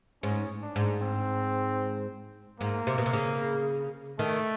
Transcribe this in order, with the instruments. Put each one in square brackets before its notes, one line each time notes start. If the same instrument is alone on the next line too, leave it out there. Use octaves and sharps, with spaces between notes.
[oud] G#2 [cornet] C#4
[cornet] D4
[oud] G#2
[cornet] C4
[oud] G#2 [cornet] A#3
[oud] C3
B2
C3
C#3
[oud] D#3 [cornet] A3